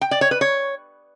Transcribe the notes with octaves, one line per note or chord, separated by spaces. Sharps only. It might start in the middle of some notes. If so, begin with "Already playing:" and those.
G5
D5
C#5
B4
C#5